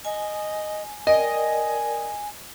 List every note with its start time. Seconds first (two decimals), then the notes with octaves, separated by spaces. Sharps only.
0.05 D#5 G#5
1.07 A#4 D5 D#5 G5 G#5